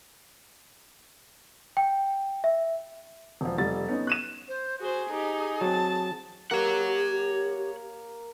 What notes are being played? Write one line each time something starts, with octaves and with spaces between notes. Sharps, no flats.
G5
E5
E1 F3
F1 G3 A6
B3 C#4 D#4
F#6 D#7 E7
C5
F#4 G#4 C5
D#4 G4
F#3 C4 A5
A#3 G4 A#4 C#5 F#5 A#5